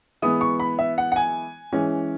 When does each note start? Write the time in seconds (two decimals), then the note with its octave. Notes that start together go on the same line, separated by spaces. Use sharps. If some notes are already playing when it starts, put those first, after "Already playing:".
0.22 E3 G#3 B3 E4 D#6
0.41 C#6
0.60 B5
0.79 E5
0.98 F#5
1.12 F#5
1.16 G#5
1.73 E3 G#3 C#4